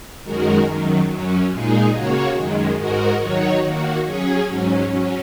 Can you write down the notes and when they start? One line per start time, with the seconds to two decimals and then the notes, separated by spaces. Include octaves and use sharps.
0.24 F#2 D#3 G#3 F#4 A#4
0.66 F#2 D#3 F#3
1.09 F#2 F#3 C#4
1.51 A#2 G#3 D#4 G#4
1.94 C#3 A#3 F#4 C#5
2.36 F#2 D#3 G#3
2.78 G#2 G#3 F#4 A#4
3.21 D#3 F#3 D#4 F#4 C#5
3.62 D#3 A#3 F#4
4.05 F#3 C#4 G#4 C#5
4.47 G#2 F#3 C#4
4.90 F#3 C#4